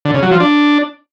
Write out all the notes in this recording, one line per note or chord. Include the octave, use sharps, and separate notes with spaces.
D3
C#3
F#3
F3
D4